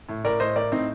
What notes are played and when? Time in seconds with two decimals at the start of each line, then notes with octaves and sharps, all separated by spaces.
0.09 A2
0.24 A2 A#4 D5
0.40 A2 C5 D#5
0.56 A2 A#4 D5
0.72 A2 C4 D#4